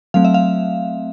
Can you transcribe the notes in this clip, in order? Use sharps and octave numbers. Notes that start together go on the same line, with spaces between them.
F#3 A3 C4 F5
E5
F5